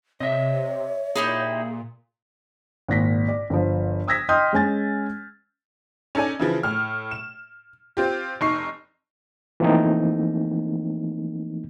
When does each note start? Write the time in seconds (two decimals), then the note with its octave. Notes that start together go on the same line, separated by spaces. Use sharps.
0.20 C3 C#5 D#5 E5
1.16 A#2 D#4 E4 G4 G#4
2.88 G#1 A#2 A#6 B6
3.28 D5
3.50 G1 F3
4.08 D#6 E6 G#6 A#6 B6
4.29 D#5 G5 C6 D#6 F6 G6
4.53 G#3 C#4 G#5 A6
6.15 C#4 D#4 A4 D5 G#5
6.39 C#3 E3 F3
6.63 A2 F6
7.11 E7
7.97 C4 F4 G4
8.41 F1 D#4 C#6 C7
9.60 E3 F3 A3 A#3 C4 D#4